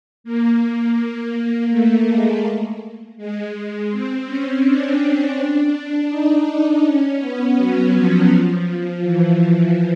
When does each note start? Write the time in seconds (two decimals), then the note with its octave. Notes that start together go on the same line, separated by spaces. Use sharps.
0.24 A#3
1.70 A3
2.07 G#3
3.17 G#3
3.90 C4
4.27 C#4
4.63 D4
6.10 D#4
6.84 C#4
7.20 B3
7.56 F#3
7.94 F3
9.03 E3